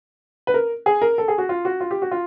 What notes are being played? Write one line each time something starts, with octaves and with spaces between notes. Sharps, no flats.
B4
A#4
G#4
A#4
A4
G#4
F#4
F4
F#4
F4
G4
F#4
F4